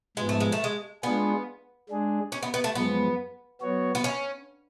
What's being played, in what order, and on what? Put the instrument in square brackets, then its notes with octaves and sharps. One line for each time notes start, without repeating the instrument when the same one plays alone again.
[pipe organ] G#2 F3 B3 [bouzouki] G#3
[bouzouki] A3
G#3
A3
G#3
[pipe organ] G#3 D4 F4 G#4 [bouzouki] B3
[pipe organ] G#3 D4 G#4
[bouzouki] C#4
B3
B3
A3
[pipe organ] F#2 F3 G#3 [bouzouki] B3
[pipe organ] F#3 B3 F#4 C#5
[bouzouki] B3
C#4